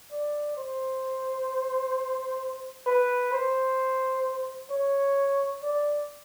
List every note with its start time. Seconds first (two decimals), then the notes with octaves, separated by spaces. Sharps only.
0.11 D5
0.57 C5
2.86 B4
3.32 C5
4.71 C#5
5.63 D5